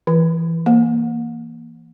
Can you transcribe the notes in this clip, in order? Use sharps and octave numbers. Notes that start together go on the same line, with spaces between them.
E3
A#3